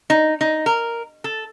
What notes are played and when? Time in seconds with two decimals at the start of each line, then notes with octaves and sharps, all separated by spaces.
0.10 D#4
0.41 D#4
0.66 A#4
1.24 A4